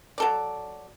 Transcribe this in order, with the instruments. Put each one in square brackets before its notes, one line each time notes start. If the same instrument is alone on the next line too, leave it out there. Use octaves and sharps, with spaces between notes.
[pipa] F#3 A4 D5